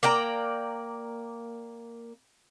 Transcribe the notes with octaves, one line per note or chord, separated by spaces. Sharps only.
A#3 D5 G5 A#5